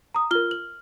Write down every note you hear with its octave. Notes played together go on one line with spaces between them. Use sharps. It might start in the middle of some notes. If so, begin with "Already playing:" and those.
A#5 D#6
F4 A#4 F6 G7
F#7